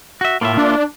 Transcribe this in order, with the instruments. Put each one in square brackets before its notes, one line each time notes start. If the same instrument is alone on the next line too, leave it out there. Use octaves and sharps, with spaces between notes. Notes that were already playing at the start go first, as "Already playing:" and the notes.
[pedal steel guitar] F#4 E5
[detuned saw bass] A2 [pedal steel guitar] A#3 F4 E5
[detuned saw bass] D4